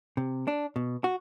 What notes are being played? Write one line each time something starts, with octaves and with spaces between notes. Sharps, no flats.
C3
D4
B2
F#4